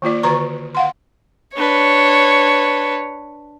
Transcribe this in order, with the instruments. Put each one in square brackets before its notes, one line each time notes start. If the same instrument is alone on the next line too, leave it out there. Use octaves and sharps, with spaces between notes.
[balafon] D#3 A#3 F4 D5
D3 D#3 F#4 B4 A#5 C#6
F5 F#5 C6
[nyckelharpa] D4 B4 [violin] C#5